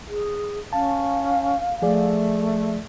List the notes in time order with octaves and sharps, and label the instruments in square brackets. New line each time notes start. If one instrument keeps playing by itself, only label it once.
[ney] G#4
[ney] C#4 [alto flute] F5 [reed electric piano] A5
[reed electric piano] F3 G#4 D5 [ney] A3